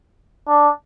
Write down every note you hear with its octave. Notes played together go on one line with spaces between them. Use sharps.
D4